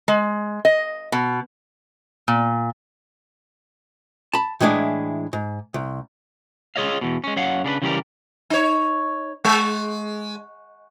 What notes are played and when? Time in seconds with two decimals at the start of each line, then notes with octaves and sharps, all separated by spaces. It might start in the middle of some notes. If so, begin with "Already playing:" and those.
0.08 G#3
0.65 D#5
1.12 B2
2.28 A#2
4.33 A5 B5
4.60 A2 E3 G#3 D4 E4
5.33 G#2
5.74 C2
6.76 F4 G#4 C#5 D#5 F5
7.01 E2 B2
7.24 G#3 C#4
7.36 F#2 C#5 F5 F#5
7.64 C#3 D4 G4 B4
7.82 C#3 E3 G3 F#4 G4 A#4
8.50 D#4 C#5
9.45 G#3